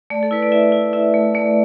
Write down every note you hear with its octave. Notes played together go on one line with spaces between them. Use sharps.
A3 D5
A4
E4 B4
D5
E4 E5
E4
E4 E5
A3
A3 D5